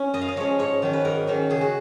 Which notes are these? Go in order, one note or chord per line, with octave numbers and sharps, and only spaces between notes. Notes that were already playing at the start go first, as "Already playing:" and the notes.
Already playing: C#4 C#5
F#2 D#5
F5
D#5
F3 G#3 C#4 C#5
G#2 C#5
D#3 F#3 C#4
B4
G#2 A#4
D#3 F#3 C#4
C#3 G#4
F#4